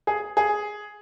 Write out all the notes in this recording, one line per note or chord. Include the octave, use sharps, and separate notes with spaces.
G#4
G#4